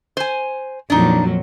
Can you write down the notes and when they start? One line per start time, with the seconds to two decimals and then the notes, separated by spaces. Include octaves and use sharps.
0.17 C5 G#5
0.90 F2 A#2 F#3 D4 D#4